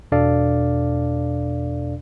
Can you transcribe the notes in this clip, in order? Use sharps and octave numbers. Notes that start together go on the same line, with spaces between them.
E2 B2 D4 A4 D5 F5